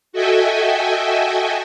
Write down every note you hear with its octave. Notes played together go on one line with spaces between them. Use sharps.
F#4 A4 D#5 E5 G5 G#5